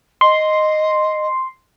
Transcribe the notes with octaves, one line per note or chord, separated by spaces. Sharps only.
D#5 C6